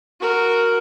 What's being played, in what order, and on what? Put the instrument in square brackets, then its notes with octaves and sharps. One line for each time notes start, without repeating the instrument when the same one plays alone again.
[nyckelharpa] F#4 A#4